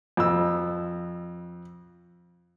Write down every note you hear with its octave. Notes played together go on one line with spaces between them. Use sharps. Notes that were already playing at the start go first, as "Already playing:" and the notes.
F2 E6